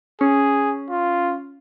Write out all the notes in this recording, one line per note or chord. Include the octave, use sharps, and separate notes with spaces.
C#4 G#4
F4